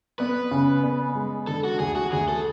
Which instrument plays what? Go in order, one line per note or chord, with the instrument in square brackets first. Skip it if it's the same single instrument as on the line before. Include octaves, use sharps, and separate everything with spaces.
[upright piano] B3 [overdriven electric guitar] B4
[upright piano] C#3
B3
G#3
[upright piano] D3 [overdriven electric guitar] A4
[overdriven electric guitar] F#4
[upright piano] D2 [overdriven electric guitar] G#4
[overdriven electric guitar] F#4
[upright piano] D2 [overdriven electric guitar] G#4
[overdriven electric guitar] A4